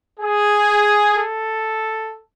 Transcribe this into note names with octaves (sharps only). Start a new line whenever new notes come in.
G#4
A4